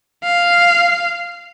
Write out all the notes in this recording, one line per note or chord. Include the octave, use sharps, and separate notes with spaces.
F5